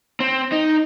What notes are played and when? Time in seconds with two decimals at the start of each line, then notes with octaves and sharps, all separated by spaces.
0.20 C4
0.52 D#4